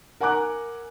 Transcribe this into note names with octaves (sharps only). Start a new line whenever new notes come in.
A#4 F#5 G#5 A#5 D6 F#6